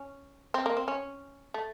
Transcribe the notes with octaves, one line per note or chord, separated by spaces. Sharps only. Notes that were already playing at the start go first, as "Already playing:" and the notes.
Already playing: C#4
C4
A#3
C4
C#4
A3